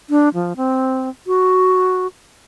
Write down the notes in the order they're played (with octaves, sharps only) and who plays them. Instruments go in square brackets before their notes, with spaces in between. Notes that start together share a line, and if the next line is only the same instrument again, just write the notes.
[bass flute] D4
F3
C4
F#4